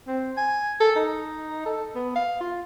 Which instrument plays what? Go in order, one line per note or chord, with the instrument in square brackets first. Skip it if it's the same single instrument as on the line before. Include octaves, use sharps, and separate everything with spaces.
[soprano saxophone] C4
G#5
A4
D#4
A4
B3
F5
F4